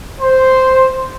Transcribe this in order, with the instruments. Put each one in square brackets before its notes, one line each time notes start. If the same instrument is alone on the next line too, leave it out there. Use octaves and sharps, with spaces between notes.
[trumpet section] C5